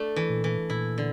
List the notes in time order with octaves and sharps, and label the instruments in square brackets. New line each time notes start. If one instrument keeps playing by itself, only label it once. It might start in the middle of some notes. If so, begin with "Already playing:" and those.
Already playing: [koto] A3 D4
E3
[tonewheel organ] A#2
[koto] E3
[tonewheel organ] A#2 [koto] E4
[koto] D3